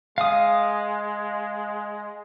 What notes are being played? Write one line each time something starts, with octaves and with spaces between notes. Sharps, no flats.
G#3 F5 D#6